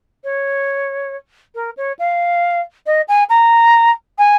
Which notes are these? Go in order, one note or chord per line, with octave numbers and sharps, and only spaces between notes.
C#5
A#4
C#5
F5
D#5
G#5
A#5
G#5